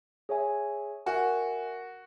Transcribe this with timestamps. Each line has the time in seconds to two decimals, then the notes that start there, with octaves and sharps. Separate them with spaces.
0.29 G#4 C#5 E5 G#5
1.06 F#4 A#4 E5 G#5